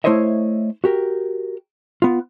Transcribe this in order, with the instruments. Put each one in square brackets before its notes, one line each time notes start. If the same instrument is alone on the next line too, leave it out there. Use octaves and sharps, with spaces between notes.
[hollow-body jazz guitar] A3 E4 C5 C#5 D#5 E5
F#4 G4 A#4
B3 F4